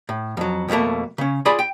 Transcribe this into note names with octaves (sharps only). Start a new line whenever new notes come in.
A2
F2 F#3
F2 B2 E3 A3 A#3
C#3 C#4
F4 G#4 D5 G#5 B5
G5